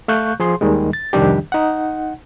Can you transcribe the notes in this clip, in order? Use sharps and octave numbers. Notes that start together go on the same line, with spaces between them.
A3 F5 C#6 F#6 G6
F3 G#4 C6
D#2 D#3 G3 G#3
A6
C2 F2 D#3 G3 D4 G4
D#4 F#5